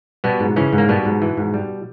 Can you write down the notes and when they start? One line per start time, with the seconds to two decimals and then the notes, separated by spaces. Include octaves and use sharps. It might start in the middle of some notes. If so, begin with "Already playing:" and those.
0.24 B2 G3 B3
0.40 G#2
0.56 C#3 E3 C#4
0.73 G#2
0.78 A#3
0.89 B2 G3 B3
1.05 G#2
1.22 E3
1.37 G#2
1.54 G3